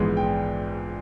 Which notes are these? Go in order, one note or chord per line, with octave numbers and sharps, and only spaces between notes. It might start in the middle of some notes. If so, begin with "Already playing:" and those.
Already playing: A#1 G#2 E3 G#3 B3
G5